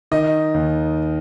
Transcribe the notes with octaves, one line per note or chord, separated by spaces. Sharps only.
D#3 D#5
D#2